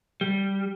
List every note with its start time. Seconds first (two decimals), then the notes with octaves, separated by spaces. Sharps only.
0.21 G3